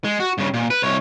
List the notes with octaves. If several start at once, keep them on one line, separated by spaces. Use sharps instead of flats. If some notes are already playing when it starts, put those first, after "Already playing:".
G#3
F#4
G2 C#3
A#2
B4
C2 C#5